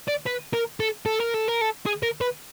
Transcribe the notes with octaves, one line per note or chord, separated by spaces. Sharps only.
D5
B4
A#4
A4
A4
A#4
A4
A#4
A4
G#4
A#4
B4